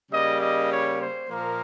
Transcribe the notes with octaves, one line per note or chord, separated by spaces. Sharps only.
C#3 G3 A#3 D#5
D#5
C#5
C5
A#2 F3 A#3 A#4